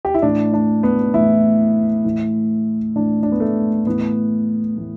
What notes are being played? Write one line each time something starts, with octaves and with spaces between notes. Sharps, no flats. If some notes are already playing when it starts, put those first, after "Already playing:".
G4
E4
A2 E3 D4
D4
B3
A2 E3 E4
A2 E3
A2 E3 D4
D4
B3
A3
A2 E3 B3
A2 E3